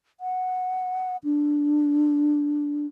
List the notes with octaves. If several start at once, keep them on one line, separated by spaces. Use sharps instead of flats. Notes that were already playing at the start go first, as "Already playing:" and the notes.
F#5
D4